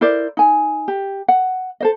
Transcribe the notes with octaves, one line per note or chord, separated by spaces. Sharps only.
E4 A#4 C5 D5
D#4 G#5
G4
F#5
A4 C5 D#5